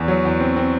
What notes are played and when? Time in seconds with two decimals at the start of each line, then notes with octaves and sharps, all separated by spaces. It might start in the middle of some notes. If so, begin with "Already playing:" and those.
Already playing: E2
0.08 F#3
0.25 E2
0.40 C4
0.56 C4